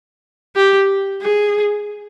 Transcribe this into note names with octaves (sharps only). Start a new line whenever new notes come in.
G4
G#4